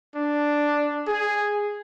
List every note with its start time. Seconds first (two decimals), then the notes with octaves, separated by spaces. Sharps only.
0.16 D4
1.08 G#4